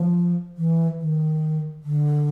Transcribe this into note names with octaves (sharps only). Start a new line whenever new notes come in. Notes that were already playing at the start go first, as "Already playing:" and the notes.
Already playing: F3
E3
D#3
D3